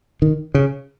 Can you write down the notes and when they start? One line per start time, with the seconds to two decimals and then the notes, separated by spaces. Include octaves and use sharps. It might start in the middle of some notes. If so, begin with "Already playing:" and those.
0.22 D#3
0.54 C#3